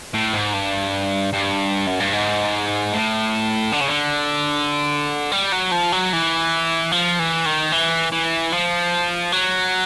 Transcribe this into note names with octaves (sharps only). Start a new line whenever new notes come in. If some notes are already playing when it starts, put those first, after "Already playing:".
A2
G#2
G2
G2
F#2
G2
G#2
A2
D3
C#3
D3
G3
F#3
F3
F#3
E3
F3
E3
D#3
E3
E3
F3
F#3